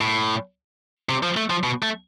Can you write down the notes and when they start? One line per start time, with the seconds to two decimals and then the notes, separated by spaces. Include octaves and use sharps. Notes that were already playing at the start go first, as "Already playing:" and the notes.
0.01 A2
1.09 C3
1.23 F3
1.37 A3
1.50 F3
1.64 B2
1.83 A3